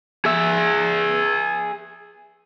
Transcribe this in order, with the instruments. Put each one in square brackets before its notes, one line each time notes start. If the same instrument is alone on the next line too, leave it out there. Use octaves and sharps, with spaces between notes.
[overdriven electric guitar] G#4 E5